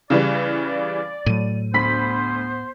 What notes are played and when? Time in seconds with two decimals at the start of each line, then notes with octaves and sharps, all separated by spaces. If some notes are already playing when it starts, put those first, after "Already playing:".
0.10 C#3 E3 G3 D5
1.26 A2 F#3 D#7
1.74 D2 B3 C5 B5 B6